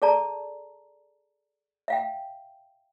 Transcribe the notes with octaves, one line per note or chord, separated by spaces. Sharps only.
G#4 A4 D5 A5 A#5
E5 F5 G5